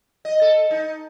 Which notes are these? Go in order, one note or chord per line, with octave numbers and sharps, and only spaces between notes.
D#5
A4
D#4